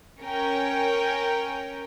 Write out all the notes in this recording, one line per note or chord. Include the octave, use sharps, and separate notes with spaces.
C#4 A#4 G5